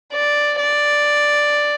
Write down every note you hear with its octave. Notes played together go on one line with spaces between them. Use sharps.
D5
D5